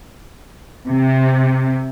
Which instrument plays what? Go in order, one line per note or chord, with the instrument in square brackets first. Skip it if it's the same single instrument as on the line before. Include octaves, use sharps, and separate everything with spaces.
[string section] C3